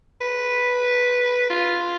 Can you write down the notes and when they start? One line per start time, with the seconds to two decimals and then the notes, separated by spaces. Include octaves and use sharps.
0.21 B4
1.50 F4